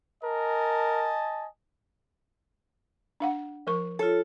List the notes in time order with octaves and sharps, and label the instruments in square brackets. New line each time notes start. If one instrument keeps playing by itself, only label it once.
[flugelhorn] A#4 [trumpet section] D#5 G#5 A5
[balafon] D4 F5 F#5
F3 A#4 C#6
[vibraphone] F4 C#5 [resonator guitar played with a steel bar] A4